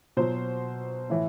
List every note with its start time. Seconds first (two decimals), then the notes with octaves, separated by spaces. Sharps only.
0.17 B2 F#3 C5
1.10 A2 E3